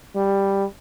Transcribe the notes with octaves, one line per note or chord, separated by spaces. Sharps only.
G3